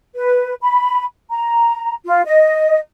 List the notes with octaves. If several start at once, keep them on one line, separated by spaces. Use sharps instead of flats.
B4
B5
A#5
F4
D#5